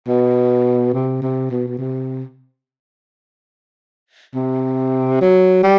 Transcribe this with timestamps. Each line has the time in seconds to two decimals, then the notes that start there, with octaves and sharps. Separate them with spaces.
0.08 B2
0.93 C3
1.22 C3
1.51 B2
1.68 B2
1.78 C3
4.35 C3
5.21 F#3
5.63 G3